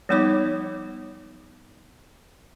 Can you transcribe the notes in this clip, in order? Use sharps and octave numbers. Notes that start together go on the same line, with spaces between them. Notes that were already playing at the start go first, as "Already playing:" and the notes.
F3 G3 B3 D#4 C#5 D6